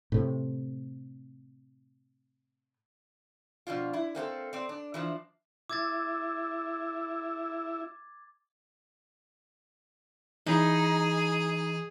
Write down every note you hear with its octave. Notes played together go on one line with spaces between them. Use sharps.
A2 C3
B2 F3 D4 F4
E4
A#3 C4 F#4 A4
C4 D5
D4
E3 F3 D4
E4 D6 G#6 A6
E3 D#4 G#4 B5